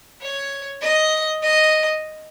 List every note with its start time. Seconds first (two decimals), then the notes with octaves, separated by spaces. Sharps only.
0.21 C#5
0.81 D#5
1.42 D#5